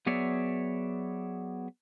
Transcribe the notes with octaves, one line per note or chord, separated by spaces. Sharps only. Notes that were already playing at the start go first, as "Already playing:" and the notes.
F#3 B3 G#4 C#5 D5 E5